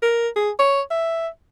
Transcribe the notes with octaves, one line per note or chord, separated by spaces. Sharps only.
A#4
G#4
C#5
E5